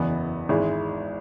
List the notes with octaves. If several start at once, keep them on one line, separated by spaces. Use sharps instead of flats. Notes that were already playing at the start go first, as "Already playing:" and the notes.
Already playing: F#1 E2 E3 B3
G#1 G#2 E3 G#3 E4